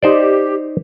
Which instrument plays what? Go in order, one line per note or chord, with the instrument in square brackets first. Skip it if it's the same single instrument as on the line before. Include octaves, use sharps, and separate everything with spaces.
[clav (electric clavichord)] D#4 C5 D5 [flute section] G4